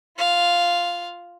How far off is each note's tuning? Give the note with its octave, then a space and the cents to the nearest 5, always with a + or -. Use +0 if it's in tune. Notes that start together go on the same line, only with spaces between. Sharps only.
F4 +0 F5 +0